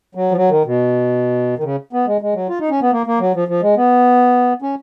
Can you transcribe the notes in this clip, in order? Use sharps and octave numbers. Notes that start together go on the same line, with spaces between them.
F#3
F3
F#3
D#3
B2
D#3
C#3
B3
G#3
G#3
F#3
F4
D#4
C#4
B3
A#3
A#3
F#3
F3
F3
G#3
B3
C#4